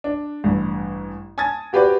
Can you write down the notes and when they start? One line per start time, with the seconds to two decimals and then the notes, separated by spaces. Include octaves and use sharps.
0.04 D4
0.44 A1 G2
1.38 G#5 A5 D#6 G#6 A6
1.73 F#4 G4 B4 C5 D5